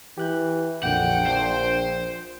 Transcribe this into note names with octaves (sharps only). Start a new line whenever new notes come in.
E3 G4 F#6 G6
A#1 F2 A#2 D3 F#5 G5
F3 D4 C5